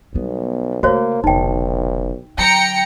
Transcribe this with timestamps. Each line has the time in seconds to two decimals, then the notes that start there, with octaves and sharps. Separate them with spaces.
0.14 B1 G3 B3
0.83 C#3 A3 A#3 F#4 C5 C#5
1.24 F1 B1 D3 D#4 G5
2.38 D3 F#3 G5 A#5 C#7